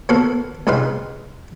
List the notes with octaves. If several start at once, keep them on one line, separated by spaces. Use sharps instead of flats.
A#3 B3 F#4 A4 B4 F5
C2 G#2 D#4 B4 F5 C6